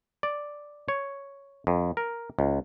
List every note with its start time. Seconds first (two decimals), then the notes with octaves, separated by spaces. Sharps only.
0.23 D5
0.89 C#5
1.67 F2
1.97 A#4
2.39 C#2